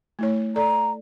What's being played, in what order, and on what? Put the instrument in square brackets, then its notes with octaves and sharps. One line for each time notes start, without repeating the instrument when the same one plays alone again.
[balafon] A3 E4 C#5
[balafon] A4 D5 [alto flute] A#5